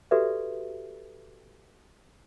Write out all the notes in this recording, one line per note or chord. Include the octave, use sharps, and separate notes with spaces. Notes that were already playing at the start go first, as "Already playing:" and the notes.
F#4 G4 A4 B4 D5 E5